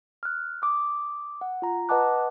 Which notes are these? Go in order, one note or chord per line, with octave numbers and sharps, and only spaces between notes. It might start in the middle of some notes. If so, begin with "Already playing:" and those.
F6 F#6
D6 D#6
F#5
F4 A#5
B4 D#5 F#5 A5 D6 F#6